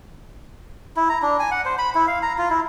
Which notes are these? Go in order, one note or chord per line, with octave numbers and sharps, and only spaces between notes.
E4
A#5
D4
G#5
F#5
C5
B5
E4
F5
A#5
F4
E4